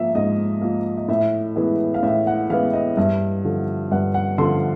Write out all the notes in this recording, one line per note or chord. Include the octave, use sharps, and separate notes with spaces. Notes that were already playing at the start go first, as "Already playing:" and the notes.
Already playing: G#2 F3 A#3 E5
G#2 D#5
F3 A#3
D#5
A2 E5
E3 G#3 B3
F5
A2 E5
F#5
E3 G#3 B3 F5
D#5
G2 E5
D3 F3
G2 F#5
F#5
D3 F3 C6